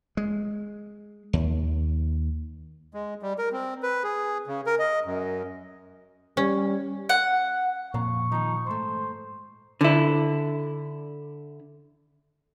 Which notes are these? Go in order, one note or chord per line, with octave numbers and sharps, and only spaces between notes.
G#3
D#2
G#3
G3
A#4
C4
B4
G#4
C#3
A#4
D#5
F#2
G3 C#4
F#5
F2 A#2 F5 A#5 C#6
D#3 F3 D#4
G#2 A3 C5
D3 E4